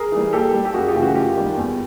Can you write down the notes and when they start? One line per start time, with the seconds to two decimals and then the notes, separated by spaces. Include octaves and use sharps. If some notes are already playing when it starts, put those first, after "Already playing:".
Already playing: G#4 A#4
0.12 E3 G3
0.33 A#2 G4 A4
0.53 G3
0.65 G4
0.74 F#2 F#4 G#4
0.88 F4 G4
0.95 C#3 E3 A3
1.02 F#4
1.15 F#2 F4 G4
1.36 D#3 G3
1.57 E2